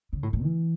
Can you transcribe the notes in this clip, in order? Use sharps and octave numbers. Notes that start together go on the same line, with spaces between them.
C#3
A2
A2
E3